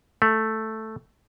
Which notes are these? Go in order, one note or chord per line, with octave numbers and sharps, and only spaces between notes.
A3